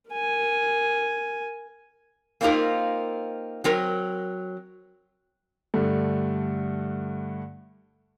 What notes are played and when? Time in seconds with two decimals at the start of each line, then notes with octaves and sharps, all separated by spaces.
0.11 A#4 G#5
2.41 A#3 C4 D#4 F4 G4 A#4
3.64 F#3 C4 A#4
5.74 G2 D3 A3